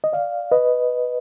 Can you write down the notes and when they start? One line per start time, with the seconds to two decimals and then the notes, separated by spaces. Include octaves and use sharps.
0.04 D#5
0.13 D5 F5
0.52 B4 D#5